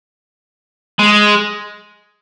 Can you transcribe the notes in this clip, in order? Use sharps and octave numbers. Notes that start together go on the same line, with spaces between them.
G#3